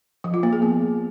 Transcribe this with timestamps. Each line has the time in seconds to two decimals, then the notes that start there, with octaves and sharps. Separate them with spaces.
0.24 F3
0.34 F4
0.43 A#3
0.53 G#4
0.62 B3